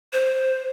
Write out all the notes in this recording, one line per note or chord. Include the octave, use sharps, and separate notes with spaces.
C5